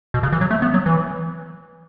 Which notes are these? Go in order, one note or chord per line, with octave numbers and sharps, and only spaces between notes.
B2
C#3
E3
F#3
A3
B3
F#3
E3